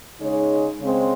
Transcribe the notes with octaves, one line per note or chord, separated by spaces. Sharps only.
C#3 G#3 D#4 G#4 C#5
C#3 G#3 C4